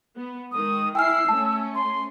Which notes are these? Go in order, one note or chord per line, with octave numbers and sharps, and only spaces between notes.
B3
D#3 G#3 D#6
E4 G5 G#5 E6 F6 C7
A3 C#4 A5
C6